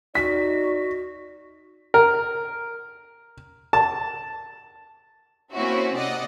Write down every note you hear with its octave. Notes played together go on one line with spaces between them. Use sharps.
D#4 F#4 D5 B6
A#4
A5
A#3 C4 C#4 E4 F#4
C3 D5 D#5 F#5